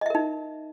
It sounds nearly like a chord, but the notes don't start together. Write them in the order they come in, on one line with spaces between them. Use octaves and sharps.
D#5 E5 A#4 D#4